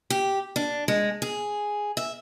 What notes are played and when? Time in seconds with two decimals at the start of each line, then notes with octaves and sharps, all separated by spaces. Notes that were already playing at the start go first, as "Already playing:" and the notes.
0.10 G4
0.56 D4
0.88 G#3
1.22 G#4
1.97 E5